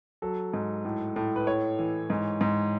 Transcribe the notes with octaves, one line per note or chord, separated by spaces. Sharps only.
F#3 A4
G#2
A2
A2
B4
A2 C#5
E3
G#2
G#2